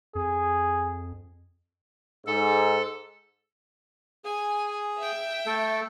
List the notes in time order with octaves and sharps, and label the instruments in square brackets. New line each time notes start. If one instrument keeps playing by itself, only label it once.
[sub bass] F2 [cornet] G#4
[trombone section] G#2 [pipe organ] A4
[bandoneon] G#4 [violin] G#5
[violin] E5 G5
[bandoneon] A3 A4